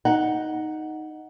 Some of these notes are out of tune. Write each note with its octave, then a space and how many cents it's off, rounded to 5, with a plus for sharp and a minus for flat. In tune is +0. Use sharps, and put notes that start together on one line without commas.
D#4 +0 F#5 +0